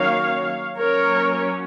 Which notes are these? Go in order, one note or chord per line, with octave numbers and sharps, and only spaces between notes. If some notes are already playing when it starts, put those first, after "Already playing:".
Already playing: D#3 F#3 A#3 C#4 C#5 F5
F#3 A#3 C#4 A#4 C#5